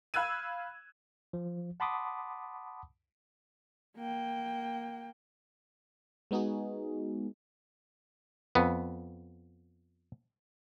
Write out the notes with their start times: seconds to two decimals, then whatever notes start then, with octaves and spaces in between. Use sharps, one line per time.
0.14 F5 B5 E6 F#6 G#6 D#7
1.33 F3
1.80 F#5 A5 B5 C6 D6 D#6
3.97 A#3 G5
6.31 G#3 B3 D#4 F#4 G#4
8.55 F2 B3